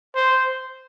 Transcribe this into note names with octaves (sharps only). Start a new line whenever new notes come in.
C5